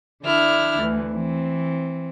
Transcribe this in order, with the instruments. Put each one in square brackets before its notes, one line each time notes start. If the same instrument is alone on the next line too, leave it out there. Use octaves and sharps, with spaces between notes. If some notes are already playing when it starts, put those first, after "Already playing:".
[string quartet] D3 D4 E4 F6
D2 E3
E3 C4